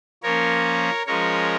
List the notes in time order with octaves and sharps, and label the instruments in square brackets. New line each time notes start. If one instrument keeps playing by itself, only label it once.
[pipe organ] F3 A#3 C#4 A#4 C#5
F3 G#3 C#4 A#4 C#5